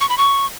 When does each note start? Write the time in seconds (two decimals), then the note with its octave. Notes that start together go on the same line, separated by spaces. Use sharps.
0.01 C#6
0.09 B5
0.18 C#6